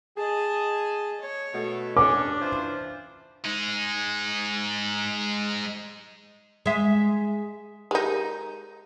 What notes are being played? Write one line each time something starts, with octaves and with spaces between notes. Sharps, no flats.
G#4 D#5 A5
C#5
B2 A3
C#4 D4 D6
E3 F4 C5
G#3 D#4
G#3 E5
G#3 D#4 G4 A#4